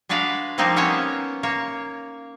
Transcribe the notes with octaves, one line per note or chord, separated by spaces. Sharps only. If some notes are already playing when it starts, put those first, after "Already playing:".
G#3 D4 F#4 B4 F5
F3 G3 A#3 C4 D#4
A#3 B3 C#4 C5 C#5
A#3 C#5